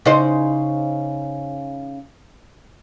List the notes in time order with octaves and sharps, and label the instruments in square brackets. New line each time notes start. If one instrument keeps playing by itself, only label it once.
[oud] C#3 D#4 C5